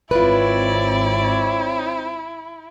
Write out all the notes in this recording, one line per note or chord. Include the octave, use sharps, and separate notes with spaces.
G#1 C4 E4 F4 B4 C#5 D5